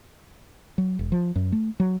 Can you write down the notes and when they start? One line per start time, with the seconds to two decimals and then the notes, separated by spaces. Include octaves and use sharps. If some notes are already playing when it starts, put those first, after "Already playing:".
0.78 F#3
0.99 E1
1.12 F3
1.36 F#2
1.52 A3
1.80 F#3